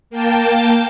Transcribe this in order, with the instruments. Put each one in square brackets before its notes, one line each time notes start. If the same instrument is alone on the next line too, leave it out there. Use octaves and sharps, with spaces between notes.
[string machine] A#3 G5 A5 A6